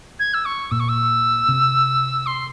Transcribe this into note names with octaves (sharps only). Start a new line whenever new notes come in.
G#6
E6
C#6
A#2 E6
C#6
E6
C3
C6